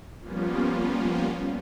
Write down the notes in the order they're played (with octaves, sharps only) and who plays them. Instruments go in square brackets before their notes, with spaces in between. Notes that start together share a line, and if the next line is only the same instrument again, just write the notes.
[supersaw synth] F3 G3 A#3 B3 C#4 F4